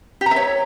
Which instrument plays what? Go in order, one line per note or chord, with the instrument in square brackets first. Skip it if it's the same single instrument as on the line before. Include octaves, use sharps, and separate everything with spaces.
[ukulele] G4
A#5
E5
C#5